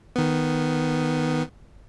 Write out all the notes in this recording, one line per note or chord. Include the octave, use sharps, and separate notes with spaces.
D#3 B3